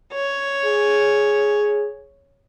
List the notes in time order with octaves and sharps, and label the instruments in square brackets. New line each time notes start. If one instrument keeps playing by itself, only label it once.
[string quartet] C#5
[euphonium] G#4